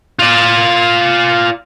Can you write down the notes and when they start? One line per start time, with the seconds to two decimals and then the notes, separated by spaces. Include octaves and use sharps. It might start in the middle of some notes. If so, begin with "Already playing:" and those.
0.19 F4 D5